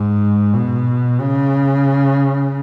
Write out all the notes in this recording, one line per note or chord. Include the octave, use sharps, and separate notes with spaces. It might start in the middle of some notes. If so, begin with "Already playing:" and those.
Already playing: G#2
B2
C#3